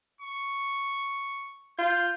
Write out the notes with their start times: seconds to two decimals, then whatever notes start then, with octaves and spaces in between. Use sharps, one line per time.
0.21 C#6
1.79 F4 G6